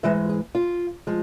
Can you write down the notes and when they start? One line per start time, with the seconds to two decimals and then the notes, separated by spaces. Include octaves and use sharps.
0.03 G#2 E3 G#3 E5
0.29 G#4
0.55 F4
1.07 F3 G#3